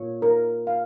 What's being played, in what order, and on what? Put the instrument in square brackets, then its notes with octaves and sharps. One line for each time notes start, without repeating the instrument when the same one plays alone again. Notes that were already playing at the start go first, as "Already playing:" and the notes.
Already playing: [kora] A#2 [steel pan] C#5
[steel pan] A#4
F5